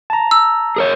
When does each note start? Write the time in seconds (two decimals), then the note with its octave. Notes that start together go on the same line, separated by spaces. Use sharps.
0.10 A5 A#5
0.31 E6
0.76 G#4 A#4 C#5